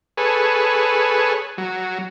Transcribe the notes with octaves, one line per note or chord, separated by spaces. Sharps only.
G#4 A4 B4 C#5
F#3